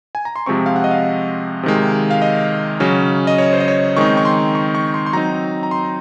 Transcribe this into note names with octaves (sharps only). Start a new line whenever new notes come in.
G#5
A#5
C6
C3 F3 G#3 C4 C#6
F5
F#5
D#5
F5
C3 D#3 G#3
F5
D#5
C#3 F#3 C#4
D#5
C#5
C5
D#5
C#5
D#3 G#3 C4 D#4 C#6
C#6
C6
C#6
C#6
C6
C6
F#3 C4 D#4 A#5
A#5
C6